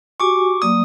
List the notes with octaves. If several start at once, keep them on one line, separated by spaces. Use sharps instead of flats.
F#4 G4 G#5 C#6 D6
F#3 A#3 D5 D#6